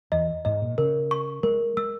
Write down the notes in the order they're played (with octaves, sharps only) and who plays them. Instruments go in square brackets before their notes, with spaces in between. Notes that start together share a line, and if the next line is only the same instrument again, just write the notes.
[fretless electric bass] E2 [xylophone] D#5
[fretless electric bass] G#2 [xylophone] D#5
[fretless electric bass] A#2
[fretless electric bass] C#3 [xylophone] A#4
[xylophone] C#6
[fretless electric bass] G#3 [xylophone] A#4
[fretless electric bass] G#3 [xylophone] E6